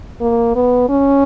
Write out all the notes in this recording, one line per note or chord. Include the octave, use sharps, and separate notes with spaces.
A#3
B3
C#4